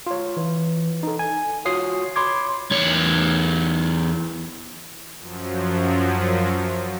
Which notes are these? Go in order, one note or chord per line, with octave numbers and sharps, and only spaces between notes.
F4 C#5
E3
D#4 A4
G#5
F4 F#4 C#5 D#6 C7
C#5 B5 C6 D6 G#6
E2 C#5
F#2 F3 F#3